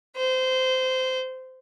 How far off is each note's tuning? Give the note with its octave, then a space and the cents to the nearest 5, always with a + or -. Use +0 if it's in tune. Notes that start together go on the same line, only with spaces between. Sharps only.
C5 -20